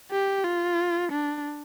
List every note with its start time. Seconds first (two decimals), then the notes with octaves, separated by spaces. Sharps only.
0.11 G4
0.45 F4
1.12 D4